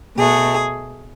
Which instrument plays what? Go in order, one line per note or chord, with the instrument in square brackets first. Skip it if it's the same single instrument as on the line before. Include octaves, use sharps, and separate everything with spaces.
[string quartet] B2 A3 G#4